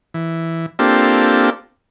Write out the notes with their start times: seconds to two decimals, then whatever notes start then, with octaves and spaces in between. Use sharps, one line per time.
0.14 E3
0.79 A#3 C4 D4 F4 G4 A4